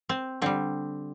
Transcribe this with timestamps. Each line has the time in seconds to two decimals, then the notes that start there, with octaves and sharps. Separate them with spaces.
0.09 C4
0.42 D3 G3 C4